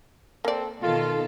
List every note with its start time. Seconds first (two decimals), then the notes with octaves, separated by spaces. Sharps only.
0.45 A#3 C4 A4 D5
0.82 B2 D#3 F4 A4